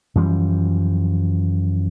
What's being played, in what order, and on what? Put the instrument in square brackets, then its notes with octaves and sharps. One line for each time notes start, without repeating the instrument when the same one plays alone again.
[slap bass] F#2 E3 F3 G3